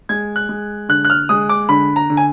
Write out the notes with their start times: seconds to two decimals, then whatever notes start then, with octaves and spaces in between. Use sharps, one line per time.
0.09 G#3 G#6
0.36 F#6
0.49 G#3
0.89 D3 F#6
1.05 F#6
1.10 F6
1.29 G#3 D#6
1.49 D6
1.69 D3 B5
1.96 A#5
2.10 D3
2.17 G#5